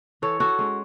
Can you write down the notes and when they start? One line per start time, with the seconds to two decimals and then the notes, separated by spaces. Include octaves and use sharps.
0.22 E3 A4 C#5
0.40 F#4 A4
0.59 G#3 C#4